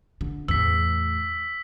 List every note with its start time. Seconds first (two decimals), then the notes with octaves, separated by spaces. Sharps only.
0.21 D3
0.48 E2 A2 E6 B6